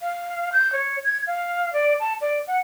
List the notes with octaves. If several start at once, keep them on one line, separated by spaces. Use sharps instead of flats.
F5
G6
C#5
G#6
F5
D5
A5
D5
F#5